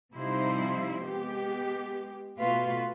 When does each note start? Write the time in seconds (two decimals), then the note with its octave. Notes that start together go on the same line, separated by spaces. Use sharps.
0.14 C3 F3 G3 D#4 E4 C5
1.02 G#3 B3 G4
2.40 B2 A3 F4 F#4 B4